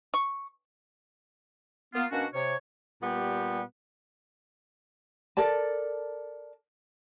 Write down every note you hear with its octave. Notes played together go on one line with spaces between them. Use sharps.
C#6
A#3 B3 F4
B2 A#3 C#4 D4 F#4
C3 C#5
A#2 G3 B3 G4
A4 A#4 D5 A5